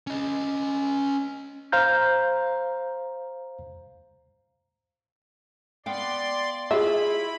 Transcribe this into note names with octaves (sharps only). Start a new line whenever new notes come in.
C#4 D#5
C5 F5 A#5 G6
B3 D5 F5 G5 C6
E4 F4 G4 G#4 D#5 E5 B5